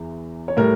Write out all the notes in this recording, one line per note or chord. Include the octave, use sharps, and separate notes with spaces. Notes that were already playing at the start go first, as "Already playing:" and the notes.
Already playing: E2 E3
C#5
A2 G3 A#4